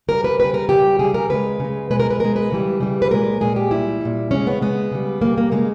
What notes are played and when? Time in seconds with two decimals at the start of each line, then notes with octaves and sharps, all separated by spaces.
0.08 C#3 G3 A#4
0.24 B4
0.39 C#3 G3 B4
0.54 A#4
0.69 C#3 G3 G4
0.99 C#3 G3 G#4
1.14 A#4
1.30 C#3 G#3 B4
1.60 C#3 G#3
1.90 B2 G#3 B4
2.00 A#4
2.10 B4
2.20 B2 G#3 A#4
2.36 B4
2.50 C#3 E3 G3
2.80 C#3 E3 G3
3.02 B4
3.11 A#2 G#3 A#4
3.41 A#2 G#3 G#4
3.56 G4
3.71 A#2 G3 E4
4.01 A#2 G3
4.31 C#3 G#3 C#4
4.47 B3
4.62 C#3 G#3 B3
4.92 C#3 G3
5.21 C#3 G3 A#3
5.38 A#3
5.52 C#3 G#3 A#3